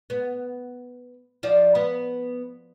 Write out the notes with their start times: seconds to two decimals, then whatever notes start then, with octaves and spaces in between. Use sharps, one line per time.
0.10 B3
1.43 F3 F4 D5
1.75 B3